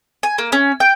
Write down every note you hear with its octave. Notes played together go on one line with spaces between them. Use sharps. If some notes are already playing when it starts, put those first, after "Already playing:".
G#5
A#3
C#4
G5